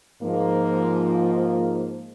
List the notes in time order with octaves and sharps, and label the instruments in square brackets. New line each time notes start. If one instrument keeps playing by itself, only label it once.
[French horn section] G#2 F3 A#3